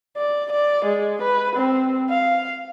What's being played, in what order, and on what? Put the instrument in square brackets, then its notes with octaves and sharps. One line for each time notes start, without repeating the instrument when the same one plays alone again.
[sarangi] D5
D5
G#3
B4
C4
F5